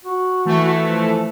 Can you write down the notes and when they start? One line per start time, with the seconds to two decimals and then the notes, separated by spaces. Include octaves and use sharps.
0.05 F#4
0.45 E3 A3
0.80 F3